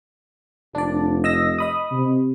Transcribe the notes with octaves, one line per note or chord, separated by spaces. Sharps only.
F1 D4 D5
D#5 E6 A#6
D#5 B5 D#6
C3